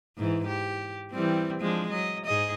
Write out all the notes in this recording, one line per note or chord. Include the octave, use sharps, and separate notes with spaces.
G#2 E3
G4
E3 G3 C4
F3 G#3 D4
F#3 D#5
G#2 G#4 D#5